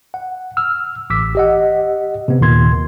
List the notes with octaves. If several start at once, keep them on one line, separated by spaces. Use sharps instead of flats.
F#5
E6 F6
A1 D6 E6 B6
G4 D#5 F#5
C3 B3
D#2 A#2 D#3 C6 G#6